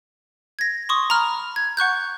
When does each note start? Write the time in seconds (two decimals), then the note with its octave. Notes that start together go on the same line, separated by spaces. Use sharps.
0.59 G#6 A#6
0.89 C6 C#6 D#6
1.10 A#5 B5 F6
1.56 G#6
1.77 F#5 C#6 F#6 G6